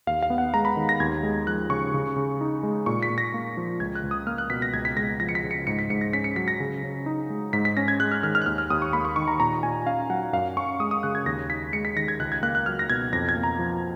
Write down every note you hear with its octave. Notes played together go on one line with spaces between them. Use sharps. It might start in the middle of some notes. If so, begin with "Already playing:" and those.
D#2 F5
F5
B3
F#5
G#3 A#5
B5
D#3
A#6
D#2 G#6
G#3
F3 F#6
C#3 C#6
C#3
C#3
D#4
G#3
A#2 C#6
B6
A#2
A#6
A#3
F3
C#2 G#6
F#6
C#2
D#6
A#3 F6
F#6
B2 B6
A#6
C#2 G#6
B6
G#3 A#6
F3 A#6
C#7
B6
C#3
C#7
G#2 C#7
B6
G#2 C#7
A#6
C#4 B6
C#7
F#3 B6
A#6
C#3
C#3
D#4
G#3
G#2 B6
B6
C#4 A#6
G#6
G#3 F#6
F6
D#3 F6
F6
F#6
D#2 F6
F6
D#2 D#6
C#6
A#3 B5
C#6
D#3 C#6
A#5
A#2 A#5
A#2 G#5
C#4 F5
F#3 F#5
F#2 F5
C#4 C#6
G#3 D#6
D#6
C#3 F#6
G#6
D#2 A#6
D#4 B6
G#3 C#7
B6
D#3 A#6
G#6
C#2 F#6
G#6
A#3 F#6
F#6
F#3 F6
A#6
B2 G#6
F2 A#6
G#6
A#3
A#5
F3